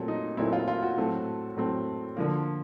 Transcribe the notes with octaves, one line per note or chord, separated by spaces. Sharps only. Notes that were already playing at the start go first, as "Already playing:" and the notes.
Already playing: A#2 F#3 A3 C4
D#4
A#2 F#3 A3 C4 E4
F4
F4
F#4
A2 F#3 A3 C4
A2 F#3 A3 C4
D3 F3 A#3